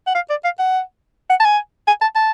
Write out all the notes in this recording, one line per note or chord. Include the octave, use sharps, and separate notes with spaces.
F#5
F5
D5
F5
F#5
F#5
A5
G#5
G#5
A5
A5